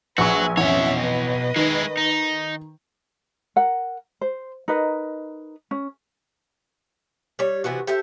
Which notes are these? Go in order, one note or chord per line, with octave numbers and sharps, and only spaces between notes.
A#1 F#3 F#4 G#4 B4 G#5 C#6
A1 F2 B2 C#4 C#5 E5
B4 D#5
D#3 G#3 E4
D#4
A#4 F#5
C5
D#4 A#4 B4 D#5
C#4
G3 C#5
C3 E3 B3 F#4
G4 A4 C5 E5